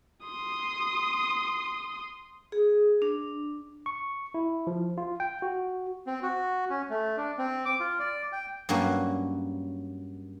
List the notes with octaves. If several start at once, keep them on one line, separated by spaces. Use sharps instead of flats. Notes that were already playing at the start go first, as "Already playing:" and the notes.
C6 D#6
G#4
D4
C#6
E4
F3
F4
G5
F#4
C4
F#4
C#4
A3
D4
C4
D6
F4
D5
G5
G2 F#3 A#3 C#4 F#4